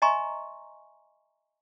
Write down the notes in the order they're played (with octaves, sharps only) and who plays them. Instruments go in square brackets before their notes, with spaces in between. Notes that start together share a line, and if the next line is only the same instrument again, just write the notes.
[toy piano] D#5 E5 G#5 A#5 C6 C#6